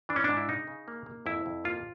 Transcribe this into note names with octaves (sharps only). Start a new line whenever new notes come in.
E3 D4
C#4
G#2 D4
E4
C#3 D#4
C#3
A#3
A#3
F2 E4
F2
A#3 F4